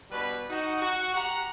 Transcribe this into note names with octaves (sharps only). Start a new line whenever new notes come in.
B2 G3 D4 B4
D#4 F#4
F#4
G4 F#5 A#5